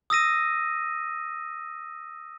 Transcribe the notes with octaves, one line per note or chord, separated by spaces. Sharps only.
D#6 E6 A#6 D#7